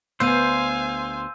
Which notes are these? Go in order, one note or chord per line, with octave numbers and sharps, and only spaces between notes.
D2 B3 C5 F5 G#5 E6 G6 D#7